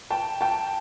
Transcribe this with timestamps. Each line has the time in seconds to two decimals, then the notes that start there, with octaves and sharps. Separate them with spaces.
0.10 G5 A5
0.41 G5 A5